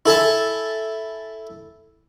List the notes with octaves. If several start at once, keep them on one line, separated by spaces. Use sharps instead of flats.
E4 A4 G#5 A5